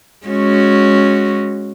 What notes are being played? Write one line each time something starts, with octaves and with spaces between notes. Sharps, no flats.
G#3 C#4 F#4